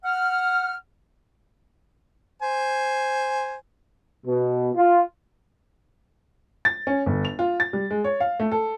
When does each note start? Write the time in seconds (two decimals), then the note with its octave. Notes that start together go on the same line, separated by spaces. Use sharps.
0.04 F#5 F6
2.42 C5 G#5
4.25 B2
4.75 F4
6.65 A6
6.87 C#4
7.06 G1
7.25 F7
7.39 F4
7.60 A6
7.73 G3
7.91 G#3
8.04 C#5
8.20 F5
8.40 A3
8.52 A4